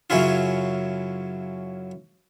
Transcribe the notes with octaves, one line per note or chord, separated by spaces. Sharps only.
F#2 C#3 F#3 C#4 E4 F4